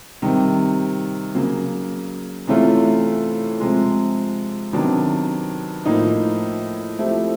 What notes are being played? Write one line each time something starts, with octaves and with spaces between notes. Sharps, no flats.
C3 D#3 G3
C#3 F#3 A#3
C3 E3 A3 C#4 F4
C3 F3 G#3
C3 D#3 F#3 B3 D4
A2 F3 A#3 D#4
F3 A3 C4 E4 G4